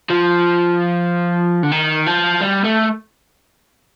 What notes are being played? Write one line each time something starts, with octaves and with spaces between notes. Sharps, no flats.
F3
D3
D#3
F3
G3
A3